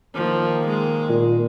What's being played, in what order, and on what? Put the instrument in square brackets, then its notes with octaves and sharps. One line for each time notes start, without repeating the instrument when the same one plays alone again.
[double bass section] D#3 A#3 [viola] F3
[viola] G#3
[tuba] A#2